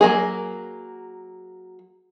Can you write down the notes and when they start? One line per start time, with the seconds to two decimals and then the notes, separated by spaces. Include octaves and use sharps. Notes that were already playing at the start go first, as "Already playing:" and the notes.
0.01 F#3 A#3 G#4